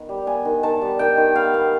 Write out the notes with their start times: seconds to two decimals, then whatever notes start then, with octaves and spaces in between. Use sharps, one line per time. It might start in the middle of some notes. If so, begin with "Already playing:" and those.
Already playing: D#3 B3
0.09 G3
0.27 B3 G#5
0.45 D#3
0.63 D#3 A5
0.81 G3
0.99 D#3 G5
1.17 D#3
1.36 B3 F5
1.54 B3